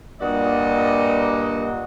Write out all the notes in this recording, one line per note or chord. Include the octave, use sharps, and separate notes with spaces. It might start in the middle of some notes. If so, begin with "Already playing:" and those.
G2 A#2 F#4 D5 D#5